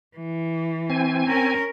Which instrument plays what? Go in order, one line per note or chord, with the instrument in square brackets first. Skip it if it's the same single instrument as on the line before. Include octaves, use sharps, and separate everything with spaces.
[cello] E3
[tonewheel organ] C4 G#5
[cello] C#4 A#4